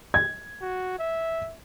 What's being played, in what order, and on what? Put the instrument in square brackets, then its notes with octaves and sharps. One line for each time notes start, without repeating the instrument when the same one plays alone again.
[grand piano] G#6
[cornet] F#4
E5